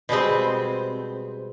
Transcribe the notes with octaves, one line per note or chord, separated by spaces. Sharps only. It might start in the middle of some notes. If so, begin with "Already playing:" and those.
B2 G3 G#3 C4